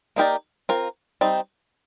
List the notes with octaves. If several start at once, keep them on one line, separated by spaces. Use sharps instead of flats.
A#3 D#4 G4 A#4 D5
C4 F4 A#4
G3 C4 D#4